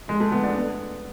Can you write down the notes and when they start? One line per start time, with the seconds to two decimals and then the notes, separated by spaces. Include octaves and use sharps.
0.08 F1 G#3
0.20 A3
0.32 E2 D3 B3
0.44 D4
0.55 B3